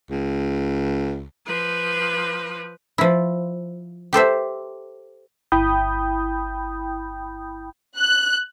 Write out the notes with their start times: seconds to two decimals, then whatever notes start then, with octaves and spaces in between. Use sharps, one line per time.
0.10 C#2
1.46 F3 B4
2.98 F3 E4
4.13 G4 A4 C5 E5
5.52 G1 E4 G5 B5 D#6 G6
7.98 F#6